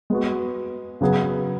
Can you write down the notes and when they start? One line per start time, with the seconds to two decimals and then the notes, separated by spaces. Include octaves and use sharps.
0.10 G#3 B3 F#4
1.01 C#3 F#3 B3 G#4